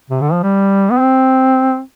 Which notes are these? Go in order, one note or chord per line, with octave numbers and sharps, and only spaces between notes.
C3
D3
F3
G3
B3
C4